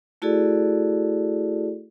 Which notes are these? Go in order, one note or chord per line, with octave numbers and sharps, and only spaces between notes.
A3 E4 F#4 G#4 A4 D5